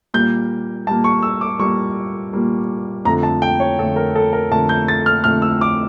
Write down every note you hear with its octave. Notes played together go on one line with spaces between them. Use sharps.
A#2 G3 A#3 G6
A#2 G3 A#3 A5
C#6
E6
D6
A#2 G3 A#3 C#6
A#2 G3 A#3
F2 D3 A3 A#5
A5
G5
C#5
F2 D3 A3 A4
A#4
A4
A#4
F2 D3 A3 A5
G6
A6
F6
F2 D3 A3 F6
E6
D6